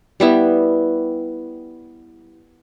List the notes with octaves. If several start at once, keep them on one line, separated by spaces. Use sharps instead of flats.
G3 B3 E4